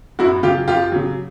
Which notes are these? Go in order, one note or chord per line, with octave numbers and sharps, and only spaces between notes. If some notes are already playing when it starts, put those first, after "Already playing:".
F#2 E4 F#4
C#3 F#3 F4 G4
F#2 F4 G4
C#3 F#3